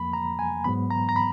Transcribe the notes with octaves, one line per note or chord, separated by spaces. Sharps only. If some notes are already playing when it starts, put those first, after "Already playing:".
Already playing: F2 F3 A#3 B5
A#5
G#5
G#2 F#3 B3 B5
A#5
A#5
B5